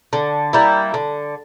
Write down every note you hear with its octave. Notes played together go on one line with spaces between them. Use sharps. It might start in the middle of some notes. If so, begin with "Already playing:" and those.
D3
G3 A#3 E4
D3